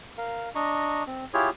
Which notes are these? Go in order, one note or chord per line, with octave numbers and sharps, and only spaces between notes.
A#4 F5
D4 D#5 A#5 C#6
C4
E4 F4 G4 G#4 C#5